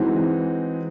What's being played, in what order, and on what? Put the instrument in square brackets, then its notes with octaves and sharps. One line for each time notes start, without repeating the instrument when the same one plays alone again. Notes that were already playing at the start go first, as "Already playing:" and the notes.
Already playing: [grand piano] E3 G#3 C4 D#4 F#4